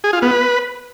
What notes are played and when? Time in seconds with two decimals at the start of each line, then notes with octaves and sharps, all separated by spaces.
0.04 G#4
0.13 F4
0.22 B3
0.31 B4